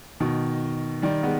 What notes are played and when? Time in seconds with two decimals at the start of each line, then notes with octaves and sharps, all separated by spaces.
0.20 B2 D#3
1.02 D#3 G3
1.23 G#3 B3